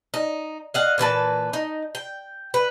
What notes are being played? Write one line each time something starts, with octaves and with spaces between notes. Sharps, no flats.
D#4
D#5 F5 F#5
A#2 E3 B4 A5
D#4
G5
B4